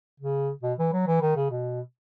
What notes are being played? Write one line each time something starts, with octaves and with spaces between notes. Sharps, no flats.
C#3
B2
E3
F#3
E3
D#3
C#3
B2